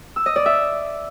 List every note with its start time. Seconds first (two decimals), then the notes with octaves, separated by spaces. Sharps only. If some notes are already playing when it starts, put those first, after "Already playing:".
0.16 E6
0.26 D#5
0.36 D5
0.46 E5